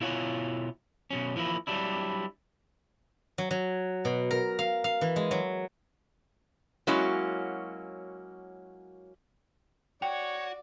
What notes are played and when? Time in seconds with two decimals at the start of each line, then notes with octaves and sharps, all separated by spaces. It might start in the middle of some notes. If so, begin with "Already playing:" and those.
0.01 B2 E4 F4 C#5 F#5 G#5
1.11 B2 F#3 C#4
1.36 E3 F3 A#3 E4
1.67 F#3 G3 D4 E4
3.38 F#3
3.51 F#3
4.05 B2
4.31 A#4
4.59 F5
4.84 F5
5.01 E3
5.16 G#3
5.31 F#3
6.87 F#3 G#3 A#3 C#4 E4 F#4
10.02 F#4 C#5 D5 G5